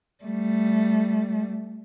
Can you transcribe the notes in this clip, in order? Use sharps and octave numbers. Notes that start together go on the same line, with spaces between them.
G3 A3